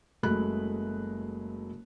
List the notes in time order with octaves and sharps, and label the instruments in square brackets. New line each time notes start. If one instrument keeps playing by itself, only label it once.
[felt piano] F#1 F#3 G#3 A3 B5 F#6